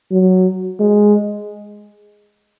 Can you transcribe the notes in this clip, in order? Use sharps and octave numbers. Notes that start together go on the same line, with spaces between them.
F#3
G#3